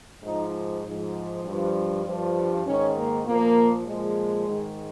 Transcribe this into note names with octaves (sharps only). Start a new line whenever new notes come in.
G#2 F3 D#4
G#2 F3
G2 F3
G2 F3
G#2 D#3 C#4
A#3
A#2 F3 A#3
A#2 F3 G#3
G#2 D#3